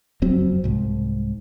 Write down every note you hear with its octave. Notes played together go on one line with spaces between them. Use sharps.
F#1 F2 F#3 C4
C2 G#2